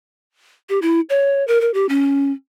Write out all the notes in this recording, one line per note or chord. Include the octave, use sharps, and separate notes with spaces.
G4
E4
C#5
A#4
A#4
G4
C#4